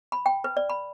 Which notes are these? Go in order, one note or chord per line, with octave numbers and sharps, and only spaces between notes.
B5
G5
B4
D5
B5